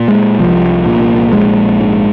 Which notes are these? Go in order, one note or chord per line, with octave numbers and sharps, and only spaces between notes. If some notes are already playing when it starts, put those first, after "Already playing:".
Already playing: A#2
G#3
C2 F3
A#2
A#1 G#3
G#2